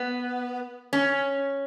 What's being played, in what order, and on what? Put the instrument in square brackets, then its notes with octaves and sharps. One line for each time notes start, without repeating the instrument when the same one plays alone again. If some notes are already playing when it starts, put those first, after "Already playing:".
Already playing: [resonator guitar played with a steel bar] B3
C#4